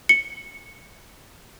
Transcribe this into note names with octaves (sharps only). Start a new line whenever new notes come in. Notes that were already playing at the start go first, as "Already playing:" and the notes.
C#7